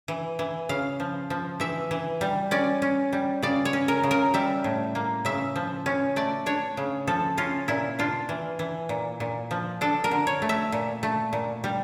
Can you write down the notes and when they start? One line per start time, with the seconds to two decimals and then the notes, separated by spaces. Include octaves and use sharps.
0.08 E3
0.39 E3
0.69 C#3 F5
1.00 F3
1.30 F3
1.60 E3 E5
1.91 E3
2.21 G3
2.51 C#4 D5
2.82 C#4
3.13 G3
3.42 C#3 D5
3.65 C#5
3.73 C#4
3.88 A#4
4.03 C#3
4.11 A#4
4.34 G3 E5
4.64 A2
4.95 A#3
5.25 C#3 E5
5.56 F3
5.86 C#4
6.16 A3 D5
6.46 D4 C#5
6.77 C#3
7.07 F3 A4
7.37 C#4 F4
7.68 A#2 E4
7.99 D4 F4
8.29 E3
8.59 E3
8.89 A#2
9.20 A#2
9.51 F3
9.81 D4 A4
10.04 A#4
10.11 D3
10.27 C#5
10.42 A3
10.49 E5
10.72 A#2
11.03 A3
11.33 A#2
11.64 G3